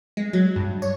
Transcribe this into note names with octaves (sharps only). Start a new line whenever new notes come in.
G#3
F#3
G2
C#5